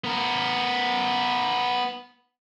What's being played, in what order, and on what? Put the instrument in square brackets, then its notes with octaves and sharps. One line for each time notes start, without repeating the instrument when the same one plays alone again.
[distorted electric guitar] B3 A#4